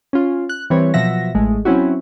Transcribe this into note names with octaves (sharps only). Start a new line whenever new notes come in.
C#4 F4
F#6
E3 G3 C4 B4 C#5
B2 F3 F#3 E5 F#5 A#6
A1 G#3 A3
F#3 C4 C#4 E4 F#4